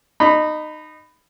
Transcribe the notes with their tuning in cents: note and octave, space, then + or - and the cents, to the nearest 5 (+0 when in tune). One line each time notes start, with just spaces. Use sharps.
D#4 -20 B5 +10